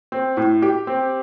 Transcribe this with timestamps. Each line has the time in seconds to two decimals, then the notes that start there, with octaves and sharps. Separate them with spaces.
0.12 C4
0.37 A2
0.62 G4
0.87 C4